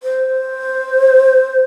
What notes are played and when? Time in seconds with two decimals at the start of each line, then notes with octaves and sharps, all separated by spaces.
0.03 C5